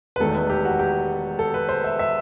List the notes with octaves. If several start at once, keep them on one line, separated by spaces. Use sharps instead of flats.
B4
E1 E2 D#3 A3 A4
B4
G4
F#4
G4
A4
B4
C5
E5
E5